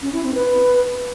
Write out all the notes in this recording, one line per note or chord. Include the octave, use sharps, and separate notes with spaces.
C#4
E4
C4
B4